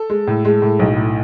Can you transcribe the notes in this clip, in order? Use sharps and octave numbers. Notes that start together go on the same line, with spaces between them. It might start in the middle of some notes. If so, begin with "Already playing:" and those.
Already playing: A4
G#3
A2
G#3
A2
B1
A2